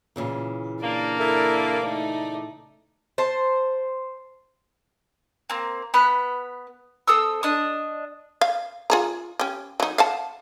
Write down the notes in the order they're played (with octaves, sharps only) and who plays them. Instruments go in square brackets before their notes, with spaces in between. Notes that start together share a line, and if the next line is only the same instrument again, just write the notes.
[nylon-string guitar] A#2 C#3 E3
[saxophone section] A#3 [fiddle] D4 D5
[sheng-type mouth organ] E4 A4 A#4
[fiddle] A3 D#4 [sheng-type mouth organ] D5
[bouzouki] C5 A5
[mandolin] A#3 C4
B3 B5 F#6
C4 A4 D#6 E6
D4 D#5 D#6
[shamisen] F5
F4 G#4 A#5
C#4 G4
F#3 D#4
F5 F#5 A5